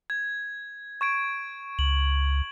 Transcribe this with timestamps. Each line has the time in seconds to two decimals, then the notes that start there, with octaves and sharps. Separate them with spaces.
0.10 G#6
1.01 C#6 G#6 D7
1.79 C#2 F#7